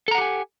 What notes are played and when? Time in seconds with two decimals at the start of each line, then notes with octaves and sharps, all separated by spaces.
0.08 A4
0.11 A#5
0.15 F#5
0.18 G4
0.21 G#5